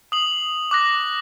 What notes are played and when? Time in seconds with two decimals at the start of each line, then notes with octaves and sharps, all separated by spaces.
0.12 D#6 F#7
0.71 D6 F#6 A#6